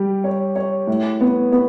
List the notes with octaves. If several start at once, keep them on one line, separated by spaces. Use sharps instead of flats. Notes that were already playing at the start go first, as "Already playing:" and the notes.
Already playing: G3 G4
C#5
C#5
A2
B3
B3